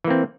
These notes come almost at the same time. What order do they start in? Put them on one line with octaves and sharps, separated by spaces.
E3 A#3 C4